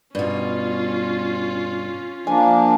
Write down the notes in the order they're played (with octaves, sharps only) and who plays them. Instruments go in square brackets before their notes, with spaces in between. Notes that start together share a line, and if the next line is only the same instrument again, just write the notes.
[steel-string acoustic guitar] G2 B2 [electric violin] C#4 F4
[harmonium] F3 A#3 D4 [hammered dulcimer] G#5